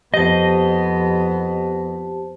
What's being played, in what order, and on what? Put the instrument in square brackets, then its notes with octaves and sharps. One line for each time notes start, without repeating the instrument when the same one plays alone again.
[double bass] F2 B3 [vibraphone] G4 C5 A5 [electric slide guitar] D#5